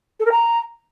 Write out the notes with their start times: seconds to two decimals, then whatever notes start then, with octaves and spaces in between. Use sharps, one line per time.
0.19 A4
0.25 A#4
0.31 A#5